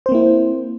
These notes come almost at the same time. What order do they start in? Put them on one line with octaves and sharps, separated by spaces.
C5 C4 A#3 E4